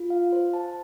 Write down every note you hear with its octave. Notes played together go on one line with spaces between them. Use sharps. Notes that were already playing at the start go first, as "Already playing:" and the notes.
Already playing: F4
F5
C5
A5